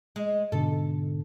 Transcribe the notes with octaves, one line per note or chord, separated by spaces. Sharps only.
G#3
G#2 B2 D3 A4